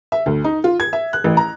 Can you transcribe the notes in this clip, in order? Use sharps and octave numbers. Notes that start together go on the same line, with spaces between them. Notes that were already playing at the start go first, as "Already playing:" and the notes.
E5
D2
D#4
F4
G#6
E5
F#6
A1
A#5